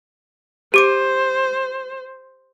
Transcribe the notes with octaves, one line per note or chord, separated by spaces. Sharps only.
G4 C5 D6 D7